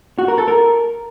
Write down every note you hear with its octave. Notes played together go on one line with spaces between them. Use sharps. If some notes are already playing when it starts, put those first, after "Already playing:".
F#4
A#4
A4
A#4